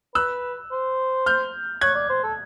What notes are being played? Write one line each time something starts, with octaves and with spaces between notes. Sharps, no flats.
B4 E6 F#6
C5
F6 G6
C#5 F#6 G#6
D5
C5
A4